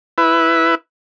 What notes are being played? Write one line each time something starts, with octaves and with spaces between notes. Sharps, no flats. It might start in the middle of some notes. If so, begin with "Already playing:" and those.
E4 B4